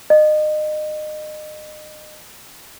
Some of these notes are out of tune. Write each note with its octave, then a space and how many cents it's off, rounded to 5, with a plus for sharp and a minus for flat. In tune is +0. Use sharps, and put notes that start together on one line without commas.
D#5 -30